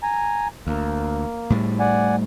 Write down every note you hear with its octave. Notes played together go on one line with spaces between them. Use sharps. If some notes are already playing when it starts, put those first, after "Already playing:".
G#5 A#5
D2 A#3
A2 G3
D5 F#5 G#5